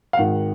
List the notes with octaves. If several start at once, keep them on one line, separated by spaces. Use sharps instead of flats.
F5
G#1 G#2 D#3 F#5